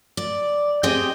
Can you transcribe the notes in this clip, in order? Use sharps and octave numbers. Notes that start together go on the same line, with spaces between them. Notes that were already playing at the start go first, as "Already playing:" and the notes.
D5
C4 G4 G#4 D#5 G5